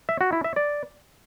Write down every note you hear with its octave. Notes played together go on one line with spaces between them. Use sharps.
E5
F#4
E4
E5
D5